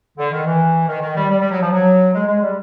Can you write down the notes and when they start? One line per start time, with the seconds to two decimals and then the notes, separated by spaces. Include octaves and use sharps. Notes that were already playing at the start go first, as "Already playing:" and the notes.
0.18 D3
0.32 D#3
0.46 E3
0.88 D#3
1.01 D#3
1.16 G3
1.30 G3
1.40 G3
1.51 F#3
1.61 F3
1.71 F#3
2.14 G#3
2.27 G#3
2.42 G3